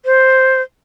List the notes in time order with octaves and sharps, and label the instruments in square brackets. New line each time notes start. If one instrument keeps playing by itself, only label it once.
[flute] C5